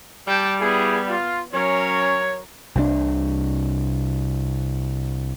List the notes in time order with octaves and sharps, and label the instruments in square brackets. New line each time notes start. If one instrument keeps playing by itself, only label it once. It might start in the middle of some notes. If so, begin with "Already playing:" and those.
[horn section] G3 [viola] G5 A5
[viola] B3 [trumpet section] E4 G#4
[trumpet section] F4
[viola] F#3 A#4 [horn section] C#4 [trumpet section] C#5
[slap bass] C2 C3 E3 D4